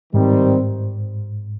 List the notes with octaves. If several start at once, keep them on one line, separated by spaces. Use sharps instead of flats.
G#2 D#3 G3 C4